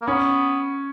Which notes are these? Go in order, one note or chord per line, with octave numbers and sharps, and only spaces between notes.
A#3
B3 C#4